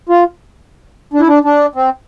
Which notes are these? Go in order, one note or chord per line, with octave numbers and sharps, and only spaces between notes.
F4
D4
E4
D4
D4
C4